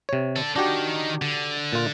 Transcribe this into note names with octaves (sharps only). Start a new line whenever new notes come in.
C3 C#5
A4 D5
D#3 D4 D#4 F#4 G4
D3
A#2 F4